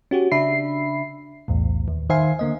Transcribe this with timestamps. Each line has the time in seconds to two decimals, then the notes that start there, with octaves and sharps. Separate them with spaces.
0.11 C#4 F#4 G4
0.32 C#3 D4 E5 B5 C7
1.48 B1 E2 A2
1.88 D#2
2.10 D#3 C5 E5 F5 G#5 C7
2.39 D3 A#3 D#5